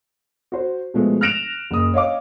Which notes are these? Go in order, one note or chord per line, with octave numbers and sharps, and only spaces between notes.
F#4 C5
B2 F3 G#3 A3 B3
F6 F#6 A#6 D7 E7 F7
F#1 D#6
C#5 D#5 F5 D6